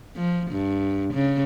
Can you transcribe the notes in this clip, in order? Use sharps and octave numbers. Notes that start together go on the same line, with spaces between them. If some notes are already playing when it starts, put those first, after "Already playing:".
F3
G2
C#3